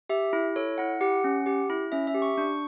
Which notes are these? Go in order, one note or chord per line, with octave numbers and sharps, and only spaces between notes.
G4 E5
E4
A4 C#5
E4 F#5
G4 F#5
C#4
G4
E4
C#4 E5
E5
G4
C#6
D4 C#6